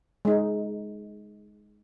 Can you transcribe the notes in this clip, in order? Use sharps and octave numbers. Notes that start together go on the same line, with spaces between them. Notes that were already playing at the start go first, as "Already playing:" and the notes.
G#3 D#4